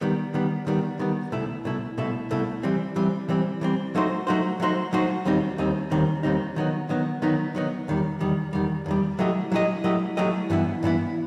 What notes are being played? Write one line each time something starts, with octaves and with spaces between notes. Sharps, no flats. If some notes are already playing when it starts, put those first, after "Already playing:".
D#3 G3 B3
D#3 G3 B3
D#3 G3 B3
D#3 G3 B3
C2 B2 A3 E4
C2 B2 A3 E4
C2 B2 A3 E4
C2 B2 A3 E4
E3 G3 C4
E3 G3 C4
E3 G3 C4
E3 G3 C4
F#3 A3 D#4 F#4 C5
F#3 A3 D#4 F#4 C5
F#3 A3 D#4 F#4 C5
F#3 A3 D#4 F#4 C5
D#2 D#3 G3 C4 D#4
D#2 D#3 G3 C4 D#4
D#2 D#3 G3 C4 D#4
D#2 D#3 G3 C4 D#4
D#3 F#3 B3 D#4
D#3 F#3 B3 D#4
D#3 F#3 B3 D#4
D#3 F#3 B3 D#4
E2 D#3 G3
E2 D#3 G3
E2 D#3 G3
E2 D#3 G3
F#3 A3 E4 G4 D#5
F#3 A3 E4 G4 D#5
F#3 A3 E4 G4 D#5
F#3 A3 E4 G4 D#5
G2 E3 B3 E4
G2 E3 B3 E4